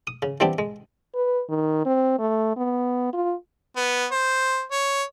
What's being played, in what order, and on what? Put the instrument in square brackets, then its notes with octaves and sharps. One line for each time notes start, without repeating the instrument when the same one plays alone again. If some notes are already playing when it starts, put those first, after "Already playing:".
[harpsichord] D#6
C#3
E3 G3 B3 C4 D4 G4
G#3
[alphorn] B4
D#3
C4
A3
B3
F4
[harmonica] B3
C5
C#5